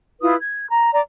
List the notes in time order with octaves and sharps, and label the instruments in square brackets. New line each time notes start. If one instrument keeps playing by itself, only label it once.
[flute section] E4 F4 B4 D#6
G#6
A#5
D5 A#5